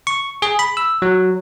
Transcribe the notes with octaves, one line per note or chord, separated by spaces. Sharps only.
C#6
G#4
B5
E6
F#3